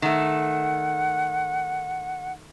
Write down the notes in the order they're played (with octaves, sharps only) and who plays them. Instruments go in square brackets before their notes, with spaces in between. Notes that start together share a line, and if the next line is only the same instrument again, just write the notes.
[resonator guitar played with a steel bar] D#3 A3 [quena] F#5